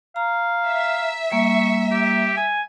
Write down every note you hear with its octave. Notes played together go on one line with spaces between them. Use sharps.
F5 A#5
E5
G3 A#3 C#6
G4
G#5